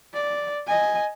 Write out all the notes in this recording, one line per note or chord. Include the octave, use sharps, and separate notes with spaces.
D5
D#5 G#5